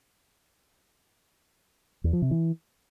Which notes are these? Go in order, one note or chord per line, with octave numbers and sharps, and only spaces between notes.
E2
F3
C3
E3